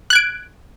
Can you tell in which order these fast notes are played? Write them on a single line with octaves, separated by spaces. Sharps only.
F#6 G#6 D7